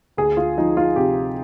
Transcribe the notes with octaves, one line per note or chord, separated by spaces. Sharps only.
D2 G#4
F4
F3 D#4
F4
C3 G4